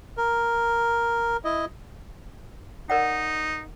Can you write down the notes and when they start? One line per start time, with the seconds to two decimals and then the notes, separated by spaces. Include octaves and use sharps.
0.17 A#4
1.44 E4 D#5
2.90 D#4 A#4 D5 F#5